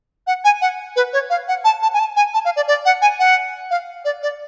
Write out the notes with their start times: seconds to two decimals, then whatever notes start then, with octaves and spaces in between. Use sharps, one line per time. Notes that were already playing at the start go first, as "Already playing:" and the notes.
0.27 F#5
0.44 G#5
0.62 F#5
0.96 B4
1.13 C#5
1.30 F5
1.48 F#5
1.65 A5
1.82 A5
1.94 G#5
1.99 A5
2.16 G#5
2.34 A5
2.45 F5
2.56 D5
2.68 D5
2.85 F#5
3.02 G#5
3.19 F#5
3.71 F5
4.05 D5
4.23 D5